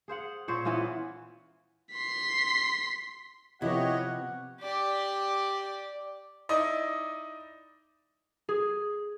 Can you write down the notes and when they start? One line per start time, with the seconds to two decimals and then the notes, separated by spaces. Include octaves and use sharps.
0.08 G#4 C5 F5 F#5
0.48 A#2 C5 C#5
0.65 E3 B3 C#4 F4
1.94 C6 B6
3.62 C3 F3 B3 E4 G4 C#5 D#5 F#5
4.61 G4 D5
6.49 D#4 E4 D5 D#5
8.49 G#4